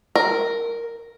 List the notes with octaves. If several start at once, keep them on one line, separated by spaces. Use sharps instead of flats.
A#4